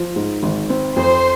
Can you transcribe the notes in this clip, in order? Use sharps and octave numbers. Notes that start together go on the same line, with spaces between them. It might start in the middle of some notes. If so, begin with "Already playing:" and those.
Already playing: F3
G#2
G#1
C4
F2 C5 C6